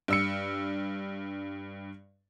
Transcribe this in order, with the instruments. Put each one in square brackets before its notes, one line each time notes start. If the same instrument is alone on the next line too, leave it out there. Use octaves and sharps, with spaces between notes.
[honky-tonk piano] G2 E6 C#7